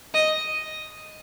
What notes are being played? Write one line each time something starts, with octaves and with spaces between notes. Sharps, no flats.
D#5